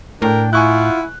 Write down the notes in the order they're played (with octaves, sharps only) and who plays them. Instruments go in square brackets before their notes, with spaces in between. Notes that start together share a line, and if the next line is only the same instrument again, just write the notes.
[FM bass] A2 [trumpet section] D4 G5 [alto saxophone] A#4
[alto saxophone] E4 [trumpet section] F4 F#5 [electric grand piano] G#5 C#6 F#6